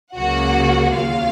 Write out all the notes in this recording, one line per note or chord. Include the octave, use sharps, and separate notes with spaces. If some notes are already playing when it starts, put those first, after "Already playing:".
C#2 C#3 F#3 A#3 F#4 F#5
D#2 C#3 F#3 A#3 F4 F5